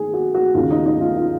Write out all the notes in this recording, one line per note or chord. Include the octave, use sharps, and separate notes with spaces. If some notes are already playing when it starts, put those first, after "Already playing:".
Already playing: D#3 G#4
F#4
F#4
D#2 C#3 F4
D#4
D#4
F4
F4